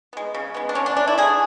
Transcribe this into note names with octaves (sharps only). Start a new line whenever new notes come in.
G#3 B3
C#3
G#3 B3
D4
D3 C#4
D4
A3 D4
E4
D3 G#4